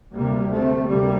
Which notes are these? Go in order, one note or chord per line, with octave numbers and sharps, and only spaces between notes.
D2 C3 G3 A#3
A3 C4
D2 C3 G3 A#3